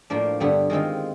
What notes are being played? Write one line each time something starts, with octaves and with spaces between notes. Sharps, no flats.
A2 F3 A#3 D4
G2 D3 G3 B3
D#3 G#3 C4 F4